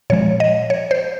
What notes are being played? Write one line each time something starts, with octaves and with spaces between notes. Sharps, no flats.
A#2 F3 G#3 C#5
D#5
C#5
C5